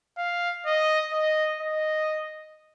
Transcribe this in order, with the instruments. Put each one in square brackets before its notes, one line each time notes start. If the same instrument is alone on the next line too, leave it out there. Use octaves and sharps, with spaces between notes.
[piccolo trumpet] F5
D#5
D#5
D#5